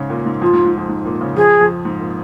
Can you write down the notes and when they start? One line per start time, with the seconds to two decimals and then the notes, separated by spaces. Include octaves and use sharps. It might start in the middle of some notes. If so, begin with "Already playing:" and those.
Already playing: G#2 C#3
0.10 A#2
0.26 G#2
0.41 F2 F4
0.53 G#2
0.65 G#2
0.78 F2
0.89 G#2
1.05 A#2
1.21 C#3
1.36 F3 G#4
1.61 F2
1.85 G#2
2.00 A#2